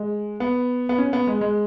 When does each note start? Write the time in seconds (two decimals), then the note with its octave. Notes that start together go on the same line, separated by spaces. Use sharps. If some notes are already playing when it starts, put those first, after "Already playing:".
Already playing: G#3
0.40 B3
0.89 B3
0.98 C#4
1.13 B3
1.27 G#3
1.41 G#3